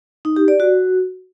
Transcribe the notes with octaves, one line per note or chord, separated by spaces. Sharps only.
D#4
G4
D5
F#4